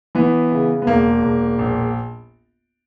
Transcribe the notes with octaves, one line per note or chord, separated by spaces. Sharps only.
E3 B3
C#3
B3
E1 A#3
E1
A#1